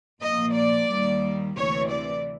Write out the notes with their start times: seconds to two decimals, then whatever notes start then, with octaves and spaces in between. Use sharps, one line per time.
0.21 A#2 F3 A#3 D#5
0.55 D5
0.89 D#2 D#3 G3 A#3
1.56 D2 C3 E3 C#5
1.90 D5